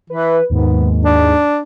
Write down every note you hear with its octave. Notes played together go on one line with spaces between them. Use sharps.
E3 B4
D#2 G#2 B3
D4